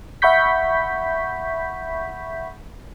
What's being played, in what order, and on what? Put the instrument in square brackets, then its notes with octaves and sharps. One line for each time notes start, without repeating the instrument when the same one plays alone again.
[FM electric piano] E5 F#5 B5 C#6 G6 B6